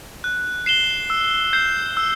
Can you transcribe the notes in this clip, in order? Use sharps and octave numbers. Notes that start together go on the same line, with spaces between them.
F#6
C7 E7 G7
E6
G6 C7
E6